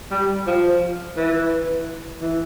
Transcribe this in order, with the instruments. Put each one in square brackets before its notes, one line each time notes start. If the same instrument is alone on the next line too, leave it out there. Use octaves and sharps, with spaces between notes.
[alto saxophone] G3
F3
E3
E3